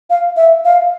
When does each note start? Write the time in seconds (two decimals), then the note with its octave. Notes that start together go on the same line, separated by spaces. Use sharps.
0.10 F5
0.37 E5
0.65 F5